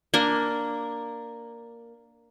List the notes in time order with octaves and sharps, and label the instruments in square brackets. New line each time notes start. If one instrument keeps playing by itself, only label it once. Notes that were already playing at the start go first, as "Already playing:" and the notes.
[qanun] A#3 D4 A#4